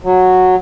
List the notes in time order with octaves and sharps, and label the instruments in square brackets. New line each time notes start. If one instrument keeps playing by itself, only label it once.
[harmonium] F#3